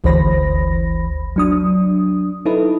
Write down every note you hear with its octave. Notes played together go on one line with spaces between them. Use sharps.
G1 D2 E3 C5 B5 A#6
F#3 D4 D#6
D#4 E4 A4 B4